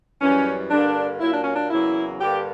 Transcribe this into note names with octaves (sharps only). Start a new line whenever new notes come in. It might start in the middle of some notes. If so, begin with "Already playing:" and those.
F#2 E3 G3 C#4
G2 D3 A#3 D4
A#2 F#3 A#3 E4
D4
C#4
D4
E2 C#3 F#3 A#3 E4
G2 D3 A#3 G4